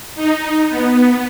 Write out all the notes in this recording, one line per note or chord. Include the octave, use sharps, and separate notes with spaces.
D#4
B3